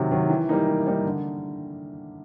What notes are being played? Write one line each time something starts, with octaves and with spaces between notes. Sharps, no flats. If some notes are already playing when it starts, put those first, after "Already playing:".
Already playing: C3 D#3 F#3
D#3 F#3
E3
G3 A#3 D#4
E3
G3 A#3 D#4
D3